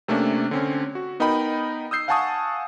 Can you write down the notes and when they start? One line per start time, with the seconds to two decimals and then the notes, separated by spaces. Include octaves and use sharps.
0.08 C3 A3 A#3 C#4 D4
0.51 D3 C4 C#4
0.95 F#4
1.20 B3 D#4 A#4 D#5 G5 B5
1.91 D#6 E6 G6 C7
2.08 F5 F#5 G#5 A5 C#6 D#6